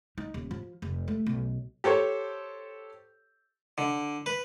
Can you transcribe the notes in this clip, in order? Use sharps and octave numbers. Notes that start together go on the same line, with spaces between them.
D#4
D#1
F3
F1
A3
B1
G4 A4 C5 C#5
D3
B4